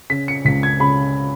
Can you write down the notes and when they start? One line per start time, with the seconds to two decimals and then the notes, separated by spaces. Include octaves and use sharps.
0.10 C#3 B6
0.28 C#7
0.45 C#2 B6
0.63 G#6
0.80 C#3 B5